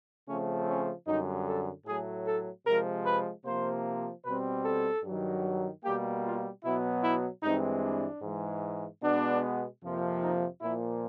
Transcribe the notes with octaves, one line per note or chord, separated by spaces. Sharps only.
C#3 F3 A3 C4 C#4
C#4
F#2 D3 G3 D#4
A4
A2 F#3 A3 G#4
A4
C3 F3 G#3 A#4
B4
C3 F3 A#3 C5
B2 G3 C4 B4
A4
G2 D#3 F#3
B2 G3 A#3 G4
F4
B2 F#3 B3 E4
E4
G2 E3 G#3 C4 D#4
D4
G#2 E3 G#3
B2 G#3 B3 D4
F2 C3 F3 A#3
D#4
A#2 F3 A#3 E4